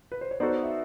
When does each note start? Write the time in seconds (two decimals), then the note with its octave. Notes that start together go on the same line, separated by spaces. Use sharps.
0.12 B4
0.21 C5
0.31 C#5
0.40 B3 D#4 F#4 A4 C5 D5
0.63 E5